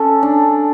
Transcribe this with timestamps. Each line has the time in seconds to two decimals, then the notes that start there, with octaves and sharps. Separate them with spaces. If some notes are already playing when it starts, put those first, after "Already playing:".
Already playing: C#4 A4
0.23 D4